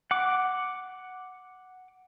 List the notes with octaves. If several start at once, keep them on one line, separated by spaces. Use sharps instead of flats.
F#5 D6